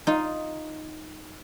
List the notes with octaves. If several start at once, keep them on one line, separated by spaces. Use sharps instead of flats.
D#4 F4